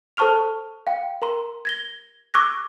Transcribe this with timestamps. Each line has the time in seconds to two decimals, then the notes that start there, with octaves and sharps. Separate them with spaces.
0.17 A4 C5 A5 C#6 F6 F7
0.87 F5 G5
1.22 A#4 A#5 C6
1.65 G#6 A#6 G7
2.34 C#6 D6 E6 F#6 G#6 A#6